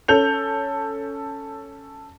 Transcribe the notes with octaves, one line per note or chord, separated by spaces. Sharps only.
C#4 A4 G6 F7